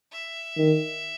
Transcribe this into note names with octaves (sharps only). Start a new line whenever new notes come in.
E5
D#3